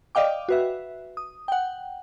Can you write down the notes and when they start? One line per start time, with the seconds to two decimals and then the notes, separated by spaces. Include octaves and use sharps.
0.15 D5 D#5 F5 G5 D6
0.49 F#4 B4 E5
1.17 D#6
1.48 F#5 G5